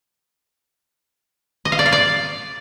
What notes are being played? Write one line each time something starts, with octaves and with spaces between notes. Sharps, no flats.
D#5
F5
D5
F5
D5